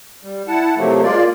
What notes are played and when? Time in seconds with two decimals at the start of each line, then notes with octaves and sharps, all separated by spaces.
0.23 G3
0.48 E4 F#5 A5
0.77 C3 F3 F#3 A3 A#3
1.03 G#3 A#3 F4 D5